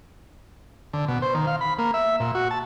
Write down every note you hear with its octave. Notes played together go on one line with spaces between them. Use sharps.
D3
B2
C5
D#3
F5
B5
A#3
E5
A#2
F#4
A5